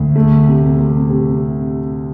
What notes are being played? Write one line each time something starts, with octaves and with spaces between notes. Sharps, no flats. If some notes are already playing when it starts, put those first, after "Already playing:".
Already playing: D2
A3
C3
C3
C3